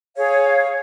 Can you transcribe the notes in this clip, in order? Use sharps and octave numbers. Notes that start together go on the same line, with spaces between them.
G#4 C#5 F5